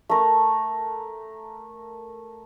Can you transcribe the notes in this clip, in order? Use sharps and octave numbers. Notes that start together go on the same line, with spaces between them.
A3 A#4